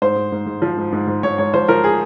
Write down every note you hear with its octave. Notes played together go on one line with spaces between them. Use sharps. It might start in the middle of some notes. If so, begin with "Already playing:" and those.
G#2 C5
G#2
G#2
G#2
F3
G#2
G#2
G#2
G#2 C#5
G#2 C#5
F3 C5
F3 A#4
G#4